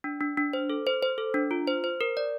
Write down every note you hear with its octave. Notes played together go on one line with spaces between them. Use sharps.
D4
D4
D4
C5
A4
C5
C5
A4
D4
F4
C5
C5
A#4
D5